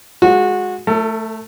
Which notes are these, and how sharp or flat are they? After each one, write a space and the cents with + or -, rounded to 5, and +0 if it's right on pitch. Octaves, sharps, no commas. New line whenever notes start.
G#3 +0 F#4 -20
A3 +0 A4 +45